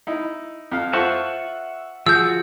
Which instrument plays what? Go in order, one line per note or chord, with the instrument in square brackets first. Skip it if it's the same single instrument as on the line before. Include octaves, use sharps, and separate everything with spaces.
[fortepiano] D#4 E4
F2 F5
[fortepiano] F4 A4 C5 [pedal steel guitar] E5 F#5 C#6
[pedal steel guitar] F3 F#4 [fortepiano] G#4 [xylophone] E6 G6